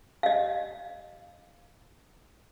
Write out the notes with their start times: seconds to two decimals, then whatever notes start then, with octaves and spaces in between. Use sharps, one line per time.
0.23 D#5 F5